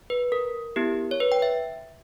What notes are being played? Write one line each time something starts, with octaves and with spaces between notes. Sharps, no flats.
B4
A#4
B3 E4 G4
C#5
B4
G5
E5